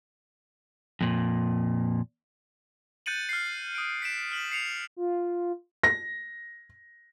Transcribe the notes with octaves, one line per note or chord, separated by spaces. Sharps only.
F2 A#2
F#6 G6 A6 C#7 D#7 F#7
F6 C7
D#6 D7
B6 C7 D7 E7
F6 B6 F#7
C7 C#7 F7
F4
A#6